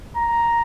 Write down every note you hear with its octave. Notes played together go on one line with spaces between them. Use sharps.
A#5